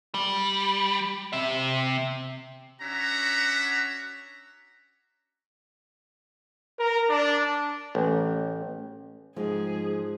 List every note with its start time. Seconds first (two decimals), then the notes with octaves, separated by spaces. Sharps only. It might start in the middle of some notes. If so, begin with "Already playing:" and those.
0.14 G3
1.33 C3 E5
2.81 C#4 D4 F#4 E5 F#5 A#5
6.78 A#4
7.09 D4
7.95 A1
9.36 G#2 F3 G#3 C4 G#4